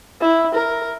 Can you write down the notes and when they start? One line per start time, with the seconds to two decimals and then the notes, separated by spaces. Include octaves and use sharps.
0.21 E4
0.55 A#4